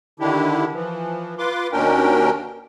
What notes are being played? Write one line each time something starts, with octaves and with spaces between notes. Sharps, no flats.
D3 D#3 D4 E4 G4
E3 F3
F4 B4 C6 D6
D#2 B2 C#4 D4 A#4 G5